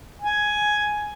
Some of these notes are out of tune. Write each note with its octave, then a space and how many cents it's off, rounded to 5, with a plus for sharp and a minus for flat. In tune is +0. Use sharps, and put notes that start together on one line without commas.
G#5 +5